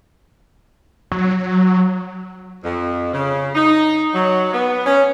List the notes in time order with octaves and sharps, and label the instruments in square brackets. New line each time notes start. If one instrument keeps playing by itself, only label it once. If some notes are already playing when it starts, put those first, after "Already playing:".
[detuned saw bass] F#3
[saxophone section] F2
C#3
D#4
F#3
B3
C#4